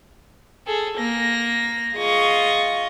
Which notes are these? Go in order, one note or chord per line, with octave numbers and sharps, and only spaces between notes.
G#4 A4
A#3 A#6
F4 G#4 D#5 C#6